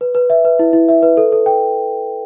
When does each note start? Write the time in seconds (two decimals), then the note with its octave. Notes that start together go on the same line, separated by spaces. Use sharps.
0.01 B4
0.15 B4
0.30 E5
0.45 B4
0.59 E4
0.73 E4
0.89 E5
1.03 B4
1.17 A4
1.32 A4
1.46 G5